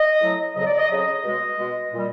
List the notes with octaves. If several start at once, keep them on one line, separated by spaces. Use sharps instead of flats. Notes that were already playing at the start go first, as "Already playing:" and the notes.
Already playing: D#5
A2 F#3
F2 C#3 F#3 D#5
D5
D#5
F2 C#3 F#3 D#5
B2 G#3
B2 G#3
A#2 G3